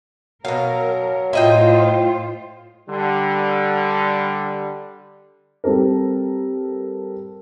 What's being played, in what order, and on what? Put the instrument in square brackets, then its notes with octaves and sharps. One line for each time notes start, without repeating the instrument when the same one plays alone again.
[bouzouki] B2 F5 [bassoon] F#3 [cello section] A#4
[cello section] A2 F4 C5 [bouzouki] E4 D#5 G5
[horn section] D3 G3
[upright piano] G3 C4 A4 A#4